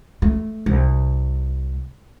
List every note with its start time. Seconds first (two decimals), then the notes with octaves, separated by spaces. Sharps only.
0.22 A3
0.66 C2